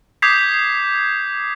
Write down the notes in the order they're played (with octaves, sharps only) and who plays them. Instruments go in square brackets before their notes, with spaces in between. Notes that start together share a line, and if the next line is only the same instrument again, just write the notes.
[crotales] D6 D#6 G6 G#6 B6 C7